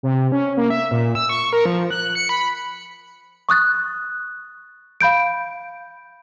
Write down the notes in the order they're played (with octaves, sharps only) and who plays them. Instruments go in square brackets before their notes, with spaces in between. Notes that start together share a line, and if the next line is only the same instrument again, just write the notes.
[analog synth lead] C3
C#4
A#3
E5
A#2
E6
C#6
A#4
F3
F#6
C#7
B5
[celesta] C#6 D#6 F#6 A6
F5 B5 G6 D7